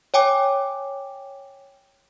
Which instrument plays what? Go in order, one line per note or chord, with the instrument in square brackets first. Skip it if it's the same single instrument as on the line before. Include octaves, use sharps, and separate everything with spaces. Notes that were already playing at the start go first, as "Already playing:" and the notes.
[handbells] C#5 G5 G#5 D6